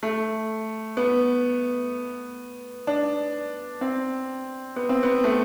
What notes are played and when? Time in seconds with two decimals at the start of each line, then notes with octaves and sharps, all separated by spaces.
0.03 A3
0.97 B3
2.87 D4
3.81 C4
4.76 B3
4.89 C4
5.03 B3
5.24 A3